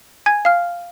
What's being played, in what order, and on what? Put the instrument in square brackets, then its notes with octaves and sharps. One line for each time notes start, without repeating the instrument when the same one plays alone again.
[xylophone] G#5 G#6
F5 F6